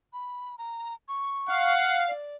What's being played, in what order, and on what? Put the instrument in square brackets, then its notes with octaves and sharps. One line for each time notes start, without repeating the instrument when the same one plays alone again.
[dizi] B5
A#5
C#6
[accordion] F5 [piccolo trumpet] F#5
[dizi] D5